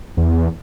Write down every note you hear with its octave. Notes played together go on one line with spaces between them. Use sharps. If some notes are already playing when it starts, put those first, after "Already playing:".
E2